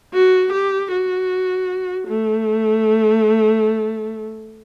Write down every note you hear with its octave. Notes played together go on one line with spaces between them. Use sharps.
F#4
G4
F#4
A3